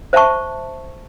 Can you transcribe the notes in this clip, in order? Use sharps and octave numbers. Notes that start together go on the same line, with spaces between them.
C5 E5 A5 C#6